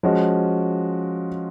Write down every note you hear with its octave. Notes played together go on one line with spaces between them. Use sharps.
F3 G#3 C#4 F#4